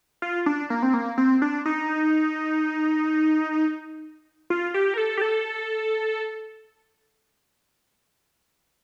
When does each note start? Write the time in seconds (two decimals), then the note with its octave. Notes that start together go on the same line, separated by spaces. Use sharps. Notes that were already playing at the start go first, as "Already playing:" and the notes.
0.22 F4
0.46 D4
0.70 A#3
0.82 C4
0.94 A#3
1.18 C4
1.42 D4
1.66 D#4
4.50 F4
4.74 G4
4.94 A#4
4.98 A4
5.17 G4
5.22 A4